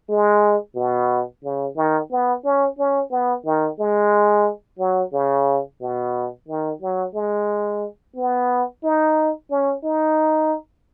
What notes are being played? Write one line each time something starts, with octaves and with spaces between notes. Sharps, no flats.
G#3
B2
C#3
D#3
B3
C#4
C#4
B3
D#3
G#3
F#3
C#3
B2
D#3
F#3
G#3
B3
D#4
C#4
D#4